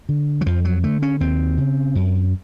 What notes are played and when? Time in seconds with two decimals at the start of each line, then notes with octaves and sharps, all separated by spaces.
0.09 D3
0.41 F#3
0.46 F2 F3
0.65 F#3
0.83 D3 A3
1.02 C#4
1.20 D#2 C4
1.58 C#3
1.95 F#2